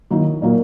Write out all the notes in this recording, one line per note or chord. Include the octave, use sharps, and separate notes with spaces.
D#3 F#3 A#3 E4
A#2 F#3 A#3